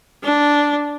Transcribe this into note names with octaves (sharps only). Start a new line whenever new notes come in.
D4